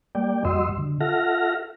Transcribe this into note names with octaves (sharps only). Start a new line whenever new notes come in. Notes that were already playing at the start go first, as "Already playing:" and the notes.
G3 A#3 D5 G5
F2 G3 F#4 D#5 C6 E6
D3
F4 A4 E5 F#5 F6 A#6